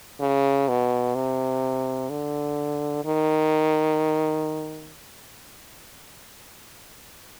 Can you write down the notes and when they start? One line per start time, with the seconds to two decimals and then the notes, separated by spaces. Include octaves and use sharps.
0.20 C#3
0.69 B2
1.15 C3
2.10 D3
3.05 D#3